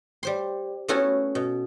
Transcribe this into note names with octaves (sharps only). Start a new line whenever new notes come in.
G3 C5 C6
A3 B3 C#4 E4 F#4 A4
B2